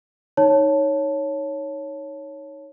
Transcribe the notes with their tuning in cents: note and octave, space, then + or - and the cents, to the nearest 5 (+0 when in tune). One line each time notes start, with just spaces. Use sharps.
D#4 +0 C#5 +0 A5 +0